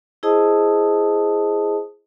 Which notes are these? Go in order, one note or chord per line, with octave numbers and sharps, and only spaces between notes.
E4 G#4 C5 D#5 A5 D#6